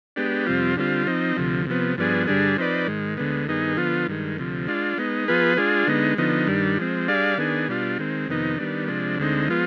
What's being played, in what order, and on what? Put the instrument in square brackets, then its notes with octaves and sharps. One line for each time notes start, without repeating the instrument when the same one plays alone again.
[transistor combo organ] G#3 B3 D4 G4
F2 C3 G3 C4 F4
D3 G3 C4 F4
F3 C4 D#4
D2 C3 F3
C3 F3 B3
G2 F3 B3 D4 G#4
G2 D3 G3 D4 G#4
F3 C4 D#4 B4 D5
G#2 D#3 G#3
D2 D3 G#3 B3
G2 D#3 B3 D#4 G#4
D3 F3 B3 F4
G2 D#3 G#3
D2 C3 F3
G#3 D4 F4
G#3 B3 D#4
F3 B3 F4 G#4 B4
G#3 D4 F4 G#4
D3 G#3 B3 D#4
D3 F3 B3 D#4
G2 D#3 G3 D4
F3 G#3 C4
G3 D4 G#4 D5 F5
D#3 B3 D4 G#4
B2 G3 D4 F4
D#3 G#3 C4
F2 C3 D#3 B3 D#4
D#3 G3 B3 D4
C3 F3 G#3 D4
D2 D3 G#3 C4 D#4
F3 G#3 B3 F4